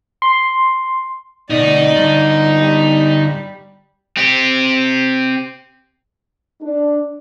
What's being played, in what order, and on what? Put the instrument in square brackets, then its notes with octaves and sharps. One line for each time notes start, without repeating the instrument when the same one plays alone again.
[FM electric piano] C6
[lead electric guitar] D2 B2 [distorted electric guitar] D#4 [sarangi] D5
[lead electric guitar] G2 D3
[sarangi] G3
[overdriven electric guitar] C4 G4
[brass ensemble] D4